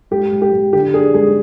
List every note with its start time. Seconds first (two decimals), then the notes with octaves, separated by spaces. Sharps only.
0.11 G#2 G4
0.32 G#2
0.42 G4
0.52 G#2
0.73 D3 G4
0.94 D4 G#4
1.14 G#3 G#4